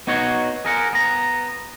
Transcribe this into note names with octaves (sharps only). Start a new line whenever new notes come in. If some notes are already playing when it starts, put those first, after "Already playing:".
B3 D#4 F#4 C#5 F#5
G#4 A#4 F#5
B3 A#5